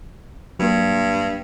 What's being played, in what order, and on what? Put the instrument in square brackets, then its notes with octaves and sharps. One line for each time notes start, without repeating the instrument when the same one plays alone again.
[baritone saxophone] G2 [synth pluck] F#3 A#3